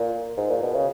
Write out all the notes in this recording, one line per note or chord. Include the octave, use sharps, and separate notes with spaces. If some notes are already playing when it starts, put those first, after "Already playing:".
Already playing: A#2
G#2
A#2
B2
C#3